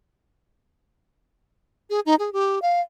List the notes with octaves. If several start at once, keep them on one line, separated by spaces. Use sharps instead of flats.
G#4
D#4
G#4
G4
F5